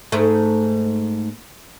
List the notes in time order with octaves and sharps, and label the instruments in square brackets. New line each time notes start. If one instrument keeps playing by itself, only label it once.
[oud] G#2 A3